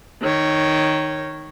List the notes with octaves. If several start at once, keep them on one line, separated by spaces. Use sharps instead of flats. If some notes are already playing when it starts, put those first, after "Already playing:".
D#3 C#5